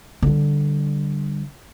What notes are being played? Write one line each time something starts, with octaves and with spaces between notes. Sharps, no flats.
D3 G3